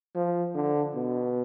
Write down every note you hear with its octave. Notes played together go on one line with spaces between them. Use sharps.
F3
D3
B2